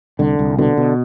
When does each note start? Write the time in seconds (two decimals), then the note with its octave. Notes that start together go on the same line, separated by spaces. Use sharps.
0.19 C2 D3
0.39 C2
0.58 B2 D3
0.77 B2